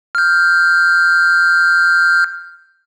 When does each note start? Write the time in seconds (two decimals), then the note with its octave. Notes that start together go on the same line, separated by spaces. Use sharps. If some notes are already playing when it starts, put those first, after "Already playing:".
0.15 F6 G6